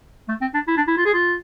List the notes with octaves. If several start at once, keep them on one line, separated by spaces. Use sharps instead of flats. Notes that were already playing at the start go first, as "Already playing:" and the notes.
A3
C4
D4
E4
D4
E4
F4
G#4
F4